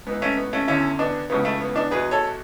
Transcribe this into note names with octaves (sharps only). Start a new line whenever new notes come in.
G#2 E3 B3
A3 C#4
B3
A3 C#4
E2 D3 C#4 E4
B3 D4
C#2 C#3 E3 B3
A3
B3
B3 D4
E2 B2 G#4 B4
A4 C#5